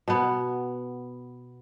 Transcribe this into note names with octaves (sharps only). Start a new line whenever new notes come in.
B2 B3